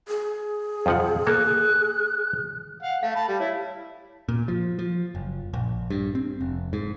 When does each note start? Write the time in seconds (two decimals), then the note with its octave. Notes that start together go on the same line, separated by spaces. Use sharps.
0.08 G#4
0.86 F2 F3 F#5
1.27 A#3 A4 F#6
2.83 F5 F#5
3.03 A3 F5
3.16 A5 B5
3.28 G3
3.40 E4 C#5
4.29 A#2
4.48 F3
4.79 F3
5.15 F#1
5.53 A#1
5.90 G2
6.15 C4
6.41 F1
6.73 G#2